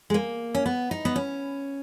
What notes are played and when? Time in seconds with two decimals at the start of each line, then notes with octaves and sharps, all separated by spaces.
0.10 G#3
0.14 A#3
0.55 C#4
0.66 B3
0.91 D#4
1.05 B3
1.16 C#4